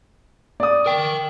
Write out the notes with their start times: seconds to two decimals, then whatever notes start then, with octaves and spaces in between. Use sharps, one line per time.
0.60 D5 D#6
0.86 A#4 G5